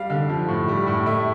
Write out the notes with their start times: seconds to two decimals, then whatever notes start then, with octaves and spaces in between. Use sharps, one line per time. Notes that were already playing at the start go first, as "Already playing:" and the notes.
Already playing: G3 F5
0.10 D3
0.29 F3
0.48 A2
0.68 G3
0.87 A2
1.06 A3 E5